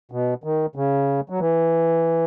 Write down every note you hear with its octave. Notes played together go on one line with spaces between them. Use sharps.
B2
D#3
C#3
F#3
E3